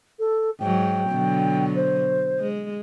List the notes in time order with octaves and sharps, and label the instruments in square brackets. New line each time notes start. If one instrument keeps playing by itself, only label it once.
[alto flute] A4
[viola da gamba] G#2 F#3 [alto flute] G5
[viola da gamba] B2 D3 F#3
[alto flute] C5
[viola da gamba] G#3